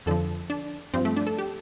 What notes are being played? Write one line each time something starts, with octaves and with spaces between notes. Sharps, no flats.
F2 D3 F3 A4
D4
G2 F3 C4
A3
D4
A4
G4